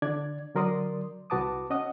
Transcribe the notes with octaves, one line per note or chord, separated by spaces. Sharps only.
D3 D4 D5 G#6
D3 F#3 A#4 D5 C6 D#6
C2 F#4 B4 A5 D6 D#6
C#4 D#5 F#5 D#6